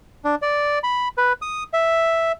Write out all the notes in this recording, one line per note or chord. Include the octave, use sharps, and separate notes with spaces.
D4
D5
B5
B4
D#6
E5